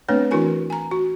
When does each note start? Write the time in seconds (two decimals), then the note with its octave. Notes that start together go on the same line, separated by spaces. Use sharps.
0.09 A3 B3 C4 D4 B4 C#5
0.31 E3 D4 E4 F#4 A#4 G#5
0.70 G#5 A#5
0.91 F#4